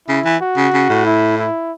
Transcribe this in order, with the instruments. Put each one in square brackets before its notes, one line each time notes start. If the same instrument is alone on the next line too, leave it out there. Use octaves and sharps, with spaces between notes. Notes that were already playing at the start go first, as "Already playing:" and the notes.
[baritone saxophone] C#3 [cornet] E4
[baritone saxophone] E3
[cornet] F#4
[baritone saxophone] C#3
C#3
A2
[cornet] E4
E4